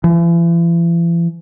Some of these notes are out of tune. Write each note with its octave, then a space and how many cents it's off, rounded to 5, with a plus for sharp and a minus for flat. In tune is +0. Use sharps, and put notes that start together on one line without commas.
E3 +40